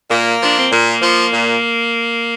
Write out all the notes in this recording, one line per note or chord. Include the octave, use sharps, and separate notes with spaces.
A#2 A#3
F3 D4
C4
A#2 A#3
F3
A#2